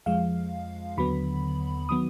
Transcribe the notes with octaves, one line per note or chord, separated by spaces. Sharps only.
F2 F3 G#3 F5
D#2 D3 F#3 B3 B5
D#3 F#3 B3 D#6